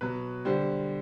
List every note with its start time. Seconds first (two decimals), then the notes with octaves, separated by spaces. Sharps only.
0.01 B2 F#3 B4
0.45 D3 G3 C5